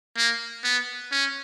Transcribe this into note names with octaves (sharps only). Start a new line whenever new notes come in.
A#3
B3
C#4